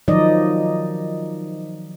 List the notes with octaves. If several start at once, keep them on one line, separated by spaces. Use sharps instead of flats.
D#3 F3 F#3 D#4 D5 D#5